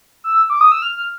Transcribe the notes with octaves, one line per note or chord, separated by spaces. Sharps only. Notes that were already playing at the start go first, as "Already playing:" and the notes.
E6
D6
D#6
E6
F6
F6